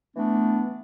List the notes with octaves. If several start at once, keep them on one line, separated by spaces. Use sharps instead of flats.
E3 A3 B3 D4